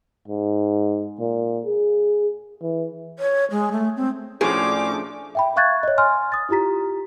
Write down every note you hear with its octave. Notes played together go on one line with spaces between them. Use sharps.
G#2
A#2
G#4
E3
C#5
G#3
A3
C4
A2 F3 A3 C#4 D4 G#4 D6
E5 G5 B5
E5 F5 C#6 F#6 G#6 A6
C#5 D#5
G#5 C6 F6
D#6 A6
E4 F4 G4 A#5 B6